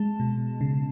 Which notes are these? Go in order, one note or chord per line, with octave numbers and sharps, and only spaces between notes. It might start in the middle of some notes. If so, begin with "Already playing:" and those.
Already playing: G#3 A5
B2
C#3